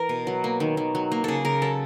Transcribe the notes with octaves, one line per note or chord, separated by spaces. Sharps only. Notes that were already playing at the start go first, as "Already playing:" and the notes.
Already playing: E3 A#4
B2
F#3
A#3
D#3
D#3
F#3
A#3
C#3 G#4 A4
C#3 A#4
F#3 A4